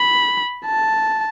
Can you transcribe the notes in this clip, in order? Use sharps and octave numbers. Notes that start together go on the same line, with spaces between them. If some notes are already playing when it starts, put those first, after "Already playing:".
Already playing: B5
A5